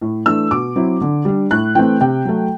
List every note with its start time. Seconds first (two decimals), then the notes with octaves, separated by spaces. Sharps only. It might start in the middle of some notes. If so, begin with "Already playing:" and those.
0.01 A2
0.26 E3 A3 D4 E6
0.51 B2 D6
0.76 F#3 C4 E4
1.01 D3
1.25 G3 D4
1.51 A2 F#6
1.75 E3 A3 C4 G5
2.00 C3 G5
2.25 F#3 A3